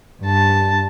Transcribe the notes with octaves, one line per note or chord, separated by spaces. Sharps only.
G2 A5